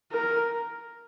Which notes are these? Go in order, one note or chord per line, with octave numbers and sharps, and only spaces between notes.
A#4